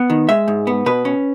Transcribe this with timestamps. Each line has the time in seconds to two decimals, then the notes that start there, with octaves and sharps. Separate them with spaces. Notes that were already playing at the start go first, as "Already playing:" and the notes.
Already playing: B3
0.10 D#3
0.29 G#3 E5
0.48 G#2
0.67 B3
0.86 B2 B4
1.05 C#4